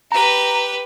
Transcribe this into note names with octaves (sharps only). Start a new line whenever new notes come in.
G4 B4 A#5